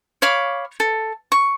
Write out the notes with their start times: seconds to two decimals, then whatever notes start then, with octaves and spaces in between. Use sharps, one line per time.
0.22 C#5 F5 B5 D6
0.80 A4
1.32 C#6